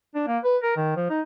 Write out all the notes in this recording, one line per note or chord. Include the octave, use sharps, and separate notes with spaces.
D4
A#3
B4
A#4
D#3
F3
D#4